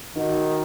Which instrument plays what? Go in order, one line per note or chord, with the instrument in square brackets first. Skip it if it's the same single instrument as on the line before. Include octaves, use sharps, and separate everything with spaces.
[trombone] D#3 [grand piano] D#4 F#4